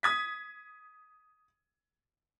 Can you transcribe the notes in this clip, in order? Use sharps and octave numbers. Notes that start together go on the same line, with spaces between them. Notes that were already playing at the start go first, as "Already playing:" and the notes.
D#6 G#6 B6